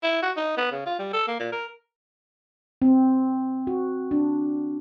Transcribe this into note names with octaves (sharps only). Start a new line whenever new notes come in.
E4
F#4
D#4
B3
C#3
F4
G3
A4
A#3
A#2
A#4
C4
F#4
D4